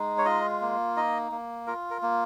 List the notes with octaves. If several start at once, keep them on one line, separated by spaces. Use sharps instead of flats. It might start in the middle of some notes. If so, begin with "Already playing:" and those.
Already playing: G#3 D#4
C#5
F4 D#5
A#3
D#4 D#5
A#3
F4 A#4
A#4
A#3